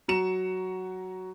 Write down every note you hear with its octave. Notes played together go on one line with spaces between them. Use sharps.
F#3 F#4 A#5 C#7 E7